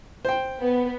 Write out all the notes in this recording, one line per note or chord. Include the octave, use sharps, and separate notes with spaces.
C5 G5
B3